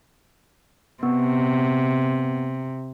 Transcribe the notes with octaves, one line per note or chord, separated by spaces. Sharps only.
C3 B3